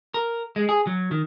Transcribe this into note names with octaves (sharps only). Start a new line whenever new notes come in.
A#4
G#3
G#4
F#3
D#3